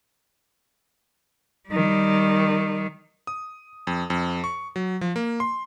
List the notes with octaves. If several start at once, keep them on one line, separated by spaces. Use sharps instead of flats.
D#3 G3
D#6
F2
F2
C#6
F#3
F3
A#3
C6